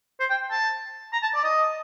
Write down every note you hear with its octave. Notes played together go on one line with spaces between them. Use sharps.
C5
G5
A5
A#5
A5
D5
D#5